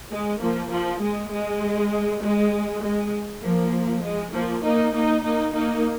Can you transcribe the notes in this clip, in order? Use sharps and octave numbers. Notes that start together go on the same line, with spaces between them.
G#3
F3 A#3
F3
G#3
G#3
G#3
G#3
F3 A#3
G#3
F3 A#3
A#3 D#4
A#3 D#4
A#3 D#4
A#3 D#4